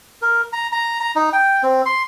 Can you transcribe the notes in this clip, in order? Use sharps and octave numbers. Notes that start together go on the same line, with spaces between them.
A#4
A#5
A#5
A#5
D#4
G5
C4
C6